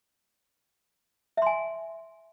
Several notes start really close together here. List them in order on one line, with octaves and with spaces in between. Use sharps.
E5 C6 G#5